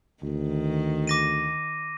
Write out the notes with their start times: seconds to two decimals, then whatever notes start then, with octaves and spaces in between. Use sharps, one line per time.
0.23 D2 D#3
1.07 D6 A#6 D#7